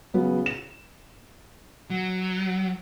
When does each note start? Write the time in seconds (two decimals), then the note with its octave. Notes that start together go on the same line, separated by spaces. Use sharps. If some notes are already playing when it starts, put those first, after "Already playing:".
0.14 C#3 F#3 B3
0.46 E7
1.90 F#3